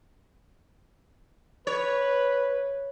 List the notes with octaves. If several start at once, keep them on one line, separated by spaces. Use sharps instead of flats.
B4 C#5